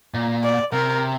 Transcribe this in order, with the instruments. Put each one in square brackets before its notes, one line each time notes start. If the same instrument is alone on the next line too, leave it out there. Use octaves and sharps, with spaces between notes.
[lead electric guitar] A#2
[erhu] D5
[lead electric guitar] C3 [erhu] A#4